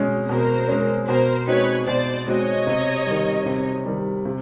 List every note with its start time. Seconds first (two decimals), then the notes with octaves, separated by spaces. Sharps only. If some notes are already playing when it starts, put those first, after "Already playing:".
Already playing: B2 G#3 C#4
0.29 B2 A#4 C5
0.68 G#3 C#4
1.08 B2 A#4 C5
1.48 G#3 C4 D#4 F#4 B4 C#5
1.87 B2 C5 D5
2.27 G#3 C4 D#4 F#4 C#5 D#5
2.67 C3
3.06 D#3 G3
3.46 C3
3.86 D#3 G3
4.25 C3